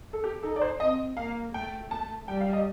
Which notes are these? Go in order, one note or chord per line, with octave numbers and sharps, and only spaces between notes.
A4
G4
D#4 A4
D5
C5
C4 D#5
A#3 F5
A3 G5
A3 A5
G3 G5
F5
D#5